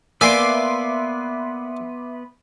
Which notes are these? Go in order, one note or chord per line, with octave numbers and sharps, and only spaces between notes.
A#3 B3 B4 D5 E5 G#5 C6 D6